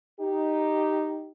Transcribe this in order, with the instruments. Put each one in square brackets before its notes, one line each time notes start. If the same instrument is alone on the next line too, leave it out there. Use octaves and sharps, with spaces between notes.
[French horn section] D#4 G4